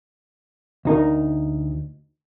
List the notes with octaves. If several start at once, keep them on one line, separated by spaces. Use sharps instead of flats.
D2 D#4 A#4